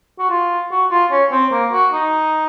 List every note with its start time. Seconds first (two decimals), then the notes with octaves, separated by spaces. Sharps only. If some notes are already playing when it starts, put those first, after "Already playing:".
0.19 F#4
0.30 F4
0.71 F#4
0.91 F4
1.11 C#4
1.32 C4
1.52 A#3
1.72 F#4
1.92 D#4